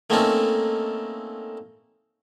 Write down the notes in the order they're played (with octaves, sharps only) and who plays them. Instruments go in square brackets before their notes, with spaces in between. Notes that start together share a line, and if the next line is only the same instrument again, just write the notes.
[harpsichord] A3 A#3 C4 C#4 D#4 A4